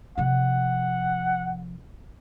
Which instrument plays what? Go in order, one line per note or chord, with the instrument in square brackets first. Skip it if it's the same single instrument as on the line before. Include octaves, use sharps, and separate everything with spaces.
[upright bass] C3 F3 [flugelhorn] F#5